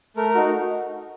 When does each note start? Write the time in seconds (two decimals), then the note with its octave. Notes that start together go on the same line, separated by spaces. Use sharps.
0.16 A3 A#4
0.35 D#4 F#4